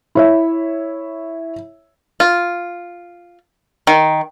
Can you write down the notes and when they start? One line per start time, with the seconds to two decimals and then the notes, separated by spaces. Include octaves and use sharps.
0.15 E4 C#5 E5
2.20 F4
3.87 D#3